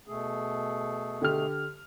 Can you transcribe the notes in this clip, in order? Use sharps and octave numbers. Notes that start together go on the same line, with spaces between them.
B2 A3 G#4
D3 G4 F6